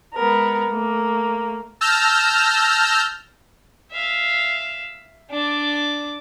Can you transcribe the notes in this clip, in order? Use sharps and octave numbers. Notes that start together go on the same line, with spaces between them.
G#3 B3 A#4
A3 A#3
A5 E6 F6 G6 A#6
E5 F5
D4 D6